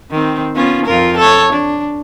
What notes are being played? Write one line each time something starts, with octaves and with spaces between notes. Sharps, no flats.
D#3 C4
B3 C#4 F4
F2 F4 A#4
A4 C#5
D4